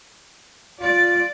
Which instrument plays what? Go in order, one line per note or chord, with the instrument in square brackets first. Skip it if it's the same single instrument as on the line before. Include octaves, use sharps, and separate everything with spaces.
[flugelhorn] F4 [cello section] D5